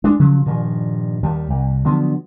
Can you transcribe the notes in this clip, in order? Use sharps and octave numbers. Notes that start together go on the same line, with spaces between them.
G#3 D4
C#3 F3 F#3 C#4
G2 A#2 D#3 F3
D#2 D#3 G3
C2
D3 F3 F#3 B3